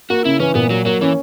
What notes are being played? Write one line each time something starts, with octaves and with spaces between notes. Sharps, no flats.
A#3 F#4
C#3 E4
E3 C#4
A#2 B3
F#3 A#3
F#3 A#3
E3 C#4